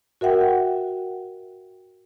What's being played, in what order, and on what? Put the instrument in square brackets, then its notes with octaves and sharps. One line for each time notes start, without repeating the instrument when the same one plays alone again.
[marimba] F#4 A#4 E5 F#5 G5